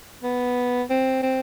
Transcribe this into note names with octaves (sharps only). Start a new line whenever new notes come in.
B3
C4
C4